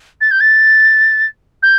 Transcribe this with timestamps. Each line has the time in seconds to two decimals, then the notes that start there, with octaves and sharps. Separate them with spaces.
0.21 A6
0.31 G6
0.40 A6
1.62 G6